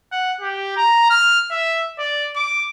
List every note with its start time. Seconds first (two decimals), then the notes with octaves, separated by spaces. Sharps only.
0.12 F#5
0.41 G4
0.77 A#5
1.10 F6
1.51 E5
1.99 D5
2.36 D6